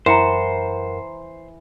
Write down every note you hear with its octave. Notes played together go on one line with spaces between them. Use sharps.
F#2 E3 A#4 C5 F#5 A#5 C#7 E7